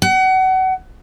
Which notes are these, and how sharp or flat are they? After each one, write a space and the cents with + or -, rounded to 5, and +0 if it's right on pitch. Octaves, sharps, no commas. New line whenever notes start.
F#5 +30